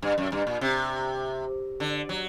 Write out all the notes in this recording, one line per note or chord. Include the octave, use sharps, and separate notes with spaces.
G2
F#2
G2
A#2
C3
D3
F#3